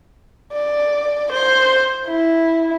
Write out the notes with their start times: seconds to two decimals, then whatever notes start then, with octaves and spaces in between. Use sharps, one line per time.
0.53 D5
1.33 C5
2.07 E4